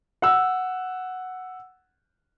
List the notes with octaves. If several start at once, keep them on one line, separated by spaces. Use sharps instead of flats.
F#5 E6